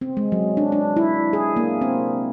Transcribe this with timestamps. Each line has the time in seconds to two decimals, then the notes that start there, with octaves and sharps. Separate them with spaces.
0.01 C4
0.17 G#3
0.32 F#3
0.57 D4
0.72 D4
0.97 E4
1.33 G#4
1.56 A#3
1.82 C4